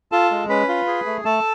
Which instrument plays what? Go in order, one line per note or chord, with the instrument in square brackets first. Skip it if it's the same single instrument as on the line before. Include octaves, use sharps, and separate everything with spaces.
[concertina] F4 A4 A5
G#3
C#4 B4 B5
F4
G#4
A3
A3 A4 A5